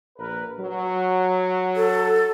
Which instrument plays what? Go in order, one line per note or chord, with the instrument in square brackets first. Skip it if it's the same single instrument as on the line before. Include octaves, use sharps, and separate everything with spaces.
[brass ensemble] A#1 A#4 B4
F#3
[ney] A4